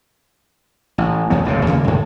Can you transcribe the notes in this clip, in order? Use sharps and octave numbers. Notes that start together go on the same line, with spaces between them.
A1
B1 E2 F#3 B3
D1 C#2 G#2 C3
D#2 C#3 A#3
F#2 A2 D3 G#3